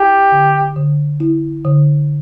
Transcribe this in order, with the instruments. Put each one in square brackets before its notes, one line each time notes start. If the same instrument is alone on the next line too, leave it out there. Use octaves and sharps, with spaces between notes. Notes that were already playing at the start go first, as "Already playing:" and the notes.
Already playing: [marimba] E4 [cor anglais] G4
[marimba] D3
D3
E4
D3